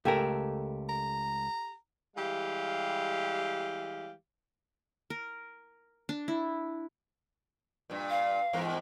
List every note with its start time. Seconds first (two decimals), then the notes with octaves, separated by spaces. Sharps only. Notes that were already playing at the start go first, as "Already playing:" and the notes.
0.05 C#2 A3 G4 A4 A#4 G#5
0.89 A#5
2.16 E3 G3 G#3 G4 F5
5.10 A#4
6.09 D4
6.28 E4
7.90 G2 A#2
8.10 F5
8.53 E2 G#2 A#4